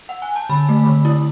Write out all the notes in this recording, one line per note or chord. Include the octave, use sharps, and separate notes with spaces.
F#5
G#5
A5
D3 B5
A3
D3
E4